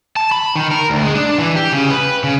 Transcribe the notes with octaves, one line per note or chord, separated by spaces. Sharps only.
A5
B5
D#3
A#4
D2
G#3
D4
E3
G4
C#3
B4
C#3